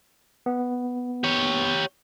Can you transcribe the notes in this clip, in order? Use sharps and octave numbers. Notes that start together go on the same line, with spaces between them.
B3
G4 C#5